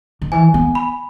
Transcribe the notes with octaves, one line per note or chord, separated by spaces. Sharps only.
D#3
E3 G#5
B3
B5